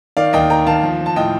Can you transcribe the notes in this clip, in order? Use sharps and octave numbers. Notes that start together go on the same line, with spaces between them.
D#3 D5 F5
D#2 D#5 G5
D#3 G5 A#5
D#2 F5 A5
F3
F3
A5
A2 D#5 G5